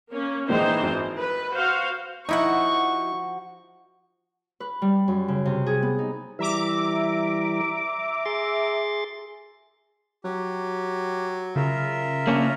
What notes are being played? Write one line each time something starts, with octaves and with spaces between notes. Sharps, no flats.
A#3 C#4
A#2 D#3 E3 G#3 D#4 C5
G#1
B4
F#4 C5 F5
F3 D#4 E4 F#4 F#5 C#6
B4
G3
F#2
C#3
C3
G#4
B3
D#4
E3 G3 E5 A#5 D6
G#4 C6 A6
F#3 G4
C#3 F4 A#4 E5
A#3 C#4 D4